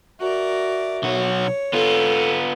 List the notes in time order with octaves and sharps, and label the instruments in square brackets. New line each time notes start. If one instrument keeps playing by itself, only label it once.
[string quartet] F#4 A#4 D5 [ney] E5
[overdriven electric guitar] B1 F#4 [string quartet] C#5
[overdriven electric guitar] B3 F4 [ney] A4